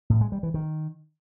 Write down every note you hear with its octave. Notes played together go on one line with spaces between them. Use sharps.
A2
G#3
G3
E3
D#3